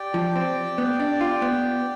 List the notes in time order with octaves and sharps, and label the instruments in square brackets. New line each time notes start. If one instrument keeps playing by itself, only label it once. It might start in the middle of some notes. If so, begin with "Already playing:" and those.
Already playing: [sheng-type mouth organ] G4 D5 G5
[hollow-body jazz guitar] F3
C4
B3
D4
F4
B3